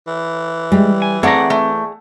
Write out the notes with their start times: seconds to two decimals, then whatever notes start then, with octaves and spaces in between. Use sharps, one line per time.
0.07 E3
0.72 G3 G#3
1.02 G#5
1.23 A3 C4 G#4 D5 F#5 A#5
1.50 A3